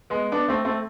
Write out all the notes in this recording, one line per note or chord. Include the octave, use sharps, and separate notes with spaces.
G#3 B3
B3 D4
A3 C4
A3 C4